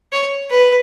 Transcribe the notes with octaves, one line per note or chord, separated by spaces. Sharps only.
C#5
B4